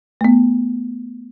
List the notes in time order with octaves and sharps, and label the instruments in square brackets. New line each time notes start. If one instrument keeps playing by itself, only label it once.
[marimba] A3 B3